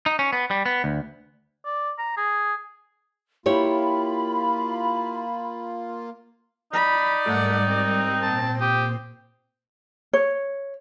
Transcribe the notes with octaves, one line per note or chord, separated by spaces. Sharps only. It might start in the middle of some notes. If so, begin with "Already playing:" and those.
D#4
C#4
B3
G3
B3
D2
D5
A#5
G#4
A#3 E4 F4 G4 C#5 B5
D#4 D5 B5
G#2 G3 A3 A#4 F#5
C4
A#2 C5 A5
G4 D#6
C#5